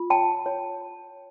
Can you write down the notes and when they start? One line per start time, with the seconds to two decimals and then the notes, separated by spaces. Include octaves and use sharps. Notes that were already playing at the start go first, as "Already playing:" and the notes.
Already playing: F4
0.10 C#5 G5 A5
0.46 C#5